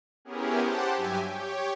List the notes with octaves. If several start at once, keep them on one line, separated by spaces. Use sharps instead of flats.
B3 C#4 E4 G4 G#4 A#4
G4 C5 F#5 A5
G2 F#3 G4 E5 G#5
G4 C#5